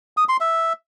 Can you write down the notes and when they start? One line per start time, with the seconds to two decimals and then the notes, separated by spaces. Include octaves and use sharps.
0.17 D#6
0.29 C6
0.40 E5